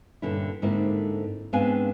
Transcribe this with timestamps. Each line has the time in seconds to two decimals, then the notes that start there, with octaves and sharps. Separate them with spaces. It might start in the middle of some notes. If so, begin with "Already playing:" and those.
0.22 G2 A#2 D3 C#4 E4
0.62 G#2 D3 A#3 C4 E4
1.53 G#2 B3 C4 D4 F5 G#5